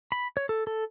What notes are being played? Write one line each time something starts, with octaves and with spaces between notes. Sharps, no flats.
B5
C#5
A4
A4